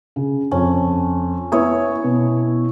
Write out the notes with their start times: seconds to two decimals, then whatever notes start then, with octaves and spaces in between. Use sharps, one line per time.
0.16 C#3
0.51 F2 C#4
1.52 B3 E4 C#5 D#6
2.04 B2